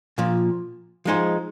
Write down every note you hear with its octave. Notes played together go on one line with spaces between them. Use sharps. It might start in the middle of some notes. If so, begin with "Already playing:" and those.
A#2 F3 A#3
F3 G#3 D#4 G#4 C5